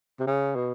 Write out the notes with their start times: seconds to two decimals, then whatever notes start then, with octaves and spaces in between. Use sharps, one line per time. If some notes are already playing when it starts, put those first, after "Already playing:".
0.20 C3
0.27 C#3
0.56 B2